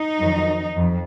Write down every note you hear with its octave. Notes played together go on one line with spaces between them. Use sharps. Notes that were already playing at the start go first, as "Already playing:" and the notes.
Already playing: D#4
F2 D#3 F#3
F2